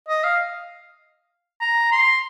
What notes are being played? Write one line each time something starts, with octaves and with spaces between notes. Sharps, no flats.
D#5
F5
A#5
C6